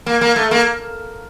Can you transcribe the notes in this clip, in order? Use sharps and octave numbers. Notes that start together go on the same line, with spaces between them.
A#3
A#3
A3
A#3